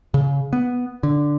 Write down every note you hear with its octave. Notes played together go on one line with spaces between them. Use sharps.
C#3
B3
D3